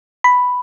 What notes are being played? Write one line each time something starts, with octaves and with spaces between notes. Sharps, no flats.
B5